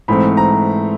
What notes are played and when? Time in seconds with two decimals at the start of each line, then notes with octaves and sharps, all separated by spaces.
0.08 G#2 E3 A3 C4 B5
0.37 A#5